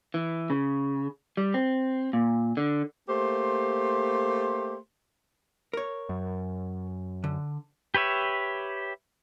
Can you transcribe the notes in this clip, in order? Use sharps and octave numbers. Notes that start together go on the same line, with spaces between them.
E3
C#3
G3
C4
A#2
D3
A3 A#3 G4 C5 C6
A#4 C#5
F#2
D3
G4 B4 C#5 E5